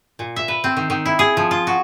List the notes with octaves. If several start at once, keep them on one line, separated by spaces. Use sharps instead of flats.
A#2
E5
B4
C4
D#3
D#3
E4
G#4
F3
F4
F#4